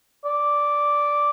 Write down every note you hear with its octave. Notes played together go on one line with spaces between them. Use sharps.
D5